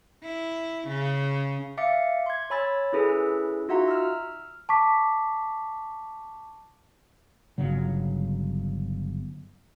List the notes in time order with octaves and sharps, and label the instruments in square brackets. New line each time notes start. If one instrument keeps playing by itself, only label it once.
[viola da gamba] E4
C#3
[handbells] E5 F5 D6 A6 C#7
C6 G#6
C#5 G#5 B5 E6 A6
C#4 E4 G#4 A4 B4
D#4 F4 F#4 E5 F#5 A#5
E6 F6
[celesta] A5 C#6 D6 B6
[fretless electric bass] G1 C#3 F#3